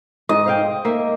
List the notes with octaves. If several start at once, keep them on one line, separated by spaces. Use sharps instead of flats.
G#2 D#5
C5 F5 G5
A#3 E5